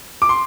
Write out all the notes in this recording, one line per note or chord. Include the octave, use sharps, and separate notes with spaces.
D6
C6